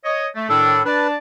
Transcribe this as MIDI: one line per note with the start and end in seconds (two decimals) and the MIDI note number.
0.05 0.27 73
0.05 0.27 75
0.35 0.46 57
0.49 0.80 45
0.49 0.80 51
0.49 0.80 62
0.49 0.83 69
0.85 1.15 62
0.85 1.07 71
0.85 1.15 74
0.85 1.15 81